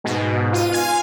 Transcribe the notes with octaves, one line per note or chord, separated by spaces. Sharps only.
G#2 B2
F4 D#7
F5 G#5